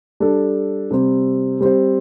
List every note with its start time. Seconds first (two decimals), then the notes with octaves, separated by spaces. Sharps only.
0.20 G3 D4 A4
0.91 C3 G3 C4
1.61 G3 C4 G4 C5